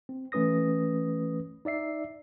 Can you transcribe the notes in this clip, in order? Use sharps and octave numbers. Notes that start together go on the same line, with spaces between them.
C4
E3 A3 C#4 B4 D#6 A#6
D#4 D5 E5 C7